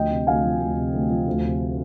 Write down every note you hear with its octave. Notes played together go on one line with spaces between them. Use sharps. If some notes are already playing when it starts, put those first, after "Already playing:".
Already playing: D2 F3 D#5 G5
C3
D2 F5 G#5
F3
D2
C3
D2
F3
D2
C3